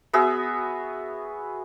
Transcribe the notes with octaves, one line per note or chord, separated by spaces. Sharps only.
B3 F#4 G#4 E5